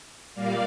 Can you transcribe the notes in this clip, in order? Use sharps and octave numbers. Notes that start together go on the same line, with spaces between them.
A#2 G3 A#3 D5 F5